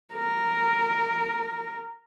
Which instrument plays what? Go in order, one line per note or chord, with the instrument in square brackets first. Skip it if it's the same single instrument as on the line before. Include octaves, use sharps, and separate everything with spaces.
[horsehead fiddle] A#4